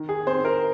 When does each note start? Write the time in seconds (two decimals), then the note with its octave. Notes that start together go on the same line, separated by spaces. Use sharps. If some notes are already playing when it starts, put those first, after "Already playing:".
Already playing: D#3
0.09 G#4
0.27 C4 C5
0.45 A#4